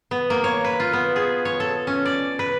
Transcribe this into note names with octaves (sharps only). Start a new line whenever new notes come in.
B3
A#3
C#5
B4
F4
B3
G#4
C#5
A4
C#4
D5
B4